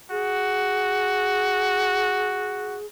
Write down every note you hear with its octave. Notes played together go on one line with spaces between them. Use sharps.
F#4 G#4